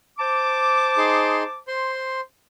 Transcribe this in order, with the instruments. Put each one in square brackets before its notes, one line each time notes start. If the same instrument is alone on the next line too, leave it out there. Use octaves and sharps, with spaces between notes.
[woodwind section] C5 A5 D6
[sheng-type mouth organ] D#4 G#4 C6
C5 C6